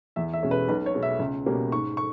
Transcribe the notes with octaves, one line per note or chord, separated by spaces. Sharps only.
E2 E5
E5
B2 G#3 C#4
B4
B1 B4
C#5
B2 G#3 B3
E5
C#2
B2 G3 A#3 C#4
G#2 C#6
C#6